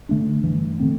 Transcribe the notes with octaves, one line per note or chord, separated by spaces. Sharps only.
D3 A3 D4
G2 E3 A3
D3 A3 C4